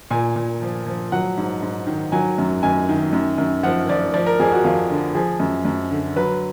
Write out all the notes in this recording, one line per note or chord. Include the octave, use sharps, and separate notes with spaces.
A#2 G#5
A#2
F3
F3
F#3 F#5
G#2
G#2
D#3
F#3 G#5
F#2
F#2 G#5
D#3
F#2
F#2
F3 F#5
F3 D5
F3 D5
A#4
F2 G#4
F#4
F2 F4
D3
F3 G#4
F#2
F#2
D3
F#3 B4